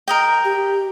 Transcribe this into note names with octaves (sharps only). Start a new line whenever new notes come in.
A#4 D#5 G5
G4